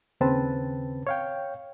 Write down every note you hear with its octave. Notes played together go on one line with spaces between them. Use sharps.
D#2 C#3 C4 B4 A5
C#5 F5 G5